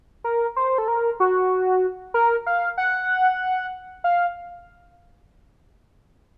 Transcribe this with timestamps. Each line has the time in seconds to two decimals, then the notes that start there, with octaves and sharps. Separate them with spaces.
0.24 A#4
0.56 C5
0.78 A4
0.88 A#4
1.20 F#4
2.14 A#4
2.47 F5
2.78 F#5
4.04 F5